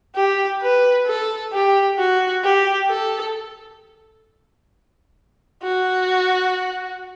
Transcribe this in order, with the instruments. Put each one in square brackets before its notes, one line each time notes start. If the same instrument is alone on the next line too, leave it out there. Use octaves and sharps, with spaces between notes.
[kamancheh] G4
B4
A4
G4
F#4
G4
A4
F#4